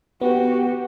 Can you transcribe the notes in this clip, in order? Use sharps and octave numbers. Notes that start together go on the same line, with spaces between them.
B3 F#4 G4